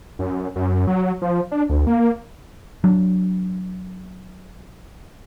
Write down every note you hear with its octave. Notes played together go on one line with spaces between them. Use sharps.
F#2
F#2
F#3
F3
D4
D2
A#3
F#3 D4